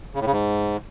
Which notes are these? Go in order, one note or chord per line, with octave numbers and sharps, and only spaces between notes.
C#3
A2
C#3
G#2